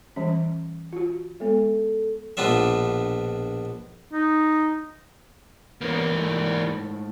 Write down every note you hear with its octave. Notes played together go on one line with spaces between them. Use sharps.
E3 G3 C#4
F4 F#4
G#3 B3 A4
A#1 B2 B3 D4 F4 E5
D#4
E3 A#3 B3 C#4 A#4
G#2 A3